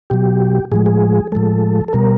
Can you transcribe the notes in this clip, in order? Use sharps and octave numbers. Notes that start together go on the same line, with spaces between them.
B2 F#3 G4
A2 F3 G#3 G#4
G#4
A2 F3 G#3 A4
A4
B2 G3 A#4